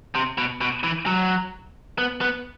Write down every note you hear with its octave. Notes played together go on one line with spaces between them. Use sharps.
C3
B2
B2
E3
F#3
B3
B3